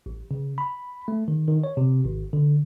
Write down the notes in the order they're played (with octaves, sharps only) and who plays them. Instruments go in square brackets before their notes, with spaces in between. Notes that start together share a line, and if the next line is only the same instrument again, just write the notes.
[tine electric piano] A1
C#3
B5
A3
D#3
D#3
C#5
C3
G#1
D3